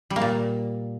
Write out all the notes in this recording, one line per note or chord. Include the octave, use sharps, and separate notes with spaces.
G3
A#3
A#2